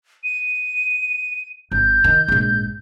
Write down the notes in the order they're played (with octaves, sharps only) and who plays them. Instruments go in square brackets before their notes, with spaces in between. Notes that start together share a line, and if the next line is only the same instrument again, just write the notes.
[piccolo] D#7
[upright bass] G#1 [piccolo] G6
[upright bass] D#3
A#1 G#2